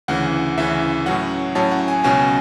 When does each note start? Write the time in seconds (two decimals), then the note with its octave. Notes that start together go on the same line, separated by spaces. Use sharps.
0.08 D2 C#3 E3 F#5
0.57 D2 C#3 E3 E5
1.06 A2 F#3 C#4 F#5
1.55 A2 F#3 C#4 A5
1.71 F#5
1.88 G#5
2.04 C#2 B2 F#3 C#4 G#5